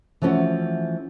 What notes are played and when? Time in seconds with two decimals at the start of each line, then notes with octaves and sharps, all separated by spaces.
0.22 E3 F3 A3 C#4 F#4